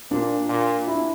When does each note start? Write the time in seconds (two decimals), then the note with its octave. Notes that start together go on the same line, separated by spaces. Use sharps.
0.11 A#2 D4
0.49 A#2
0.87 E4
0.95 D4